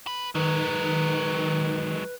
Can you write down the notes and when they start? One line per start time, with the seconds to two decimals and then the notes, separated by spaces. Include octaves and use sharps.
0.07 B4
0.35 D#3 F#3 G#3 B4